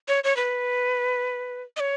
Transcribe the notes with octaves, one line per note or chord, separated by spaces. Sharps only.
C#5
C#5
B4
D#5
C#5